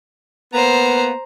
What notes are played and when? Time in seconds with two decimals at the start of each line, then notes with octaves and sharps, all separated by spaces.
0.53 A#3 B3 C5 A#5